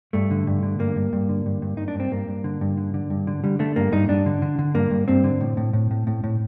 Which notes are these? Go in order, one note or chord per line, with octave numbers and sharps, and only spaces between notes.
G2 A3
D3
G2
D3
G2 A#3
G2
G2
D3
G2
G2
G2 D#4
D4
G2 C4
G2 A#3
G2
D3
G2
D3
D3
G2
D3
D3 G3
D3 A3
G2 A#3
G2 D#4
G2 D4
D3
D3
D3
G2 A#3
G2
G2 C4
D3
A2
A2
A2
A2
A2
A2